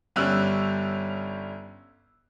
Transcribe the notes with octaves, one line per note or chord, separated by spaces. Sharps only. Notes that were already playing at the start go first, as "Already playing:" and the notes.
G1 G3 C#4 E6 F#6